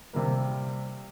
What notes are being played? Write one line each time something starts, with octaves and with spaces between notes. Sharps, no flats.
C3 G3 A#3